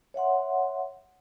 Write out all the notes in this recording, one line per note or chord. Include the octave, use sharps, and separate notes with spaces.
C#5 E5 F#5 C6